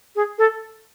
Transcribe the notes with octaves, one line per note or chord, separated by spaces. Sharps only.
G#4
A4